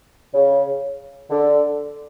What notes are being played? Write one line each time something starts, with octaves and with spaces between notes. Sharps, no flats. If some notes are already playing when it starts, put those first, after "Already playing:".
C#3
D3